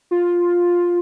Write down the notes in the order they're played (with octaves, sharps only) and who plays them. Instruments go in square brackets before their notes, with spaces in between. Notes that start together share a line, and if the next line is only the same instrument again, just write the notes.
[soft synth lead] F4